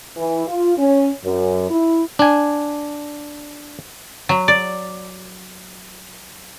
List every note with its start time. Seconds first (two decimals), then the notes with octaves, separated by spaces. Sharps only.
0.17 E3
0.47 F4
0.78 C#4
1.25 F#2
1.70 E4
2.19 D4 G#5
4.29 F#3
4.48 D5